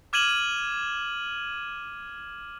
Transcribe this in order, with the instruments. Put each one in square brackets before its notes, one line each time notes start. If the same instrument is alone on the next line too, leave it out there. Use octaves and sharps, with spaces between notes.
[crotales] D6 F6 G#6 D#7 E7 F#7